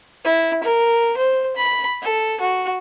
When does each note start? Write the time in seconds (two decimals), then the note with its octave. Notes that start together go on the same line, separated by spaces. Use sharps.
0.25 E4
0.64 A#4
1.17 C5
1.57 B5
2.02 A4
2.41 F#4